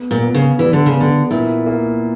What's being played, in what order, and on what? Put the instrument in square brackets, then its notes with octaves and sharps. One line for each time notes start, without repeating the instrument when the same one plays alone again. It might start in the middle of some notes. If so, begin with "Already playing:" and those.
Already playing: [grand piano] B3
[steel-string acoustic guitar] A#2
[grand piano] B3
[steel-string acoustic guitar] C#3
[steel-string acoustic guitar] E3 [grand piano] G3
[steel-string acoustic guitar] D3
C#3
[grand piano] B3
[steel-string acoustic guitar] D3
[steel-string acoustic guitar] A#2 [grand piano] E4
[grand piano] A#3